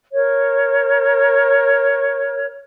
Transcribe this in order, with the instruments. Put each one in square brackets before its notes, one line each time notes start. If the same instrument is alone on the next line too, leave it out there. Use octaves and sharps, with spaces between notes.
[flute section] A#4 C#5